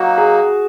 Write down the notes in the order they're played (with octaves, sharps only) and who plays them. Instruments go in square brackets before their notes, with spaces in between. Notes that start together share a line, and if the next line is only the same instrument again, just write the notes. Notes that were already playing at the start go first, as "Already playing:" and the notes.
Already playing: [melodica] F#3 A#3 D#4 [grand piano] F#4
[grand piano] G#4